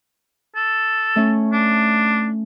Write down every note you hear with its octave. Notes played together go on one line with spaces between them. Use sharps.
A4
A3 C#4
D4